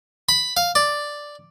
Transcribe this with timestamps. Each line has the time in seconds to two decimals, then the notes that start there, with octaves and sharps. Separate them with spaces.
0.29 B5
0.57 F5
0.75 D5